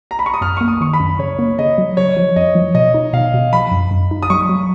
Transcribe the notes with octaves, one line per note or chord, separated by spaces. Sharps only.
A#5
B5
C#6
D#6
F#2 F6
A#3 C#6
D#6
D#3 C#6
B5
F#2
C#3 C#5
A#3
C#3 D#5
F#3
C#3 C#5
F3
F2 D#5
F3
B2 D#5
D#4
B2 F5
B2
F3 B5
F#2
F#2
D#4
D#6
F#3 C#6
F#3